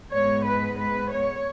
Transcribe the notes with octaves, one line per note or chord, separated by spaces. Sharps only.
G#2 G#3 B3 C#5
B4
B4
C#5